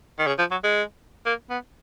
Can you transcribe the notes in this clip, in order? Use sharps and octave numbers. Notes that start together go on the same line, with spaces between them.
D#3
C#3
F3
F#3
G#3
A#3
B3